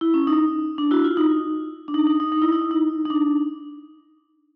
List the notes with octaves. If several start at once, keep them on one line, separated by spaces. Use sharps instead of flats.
E4
C#4
D#4
D4
E4 F#4
F4
D#4
D4
D#4
D#4
D#4
D#4
E4
D#4
E4
D#4
D#4
D4